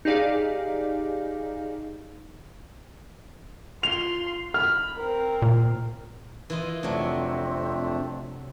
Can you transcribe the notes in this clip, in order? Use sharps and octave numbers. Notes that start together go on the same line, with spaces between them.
D#4 G4 G#4 D5 F5
F4 C6 F7
B5 F6
C4 A#4
A#2
E3 F4 D#5
F2 C3 F#3 A3 C4 D4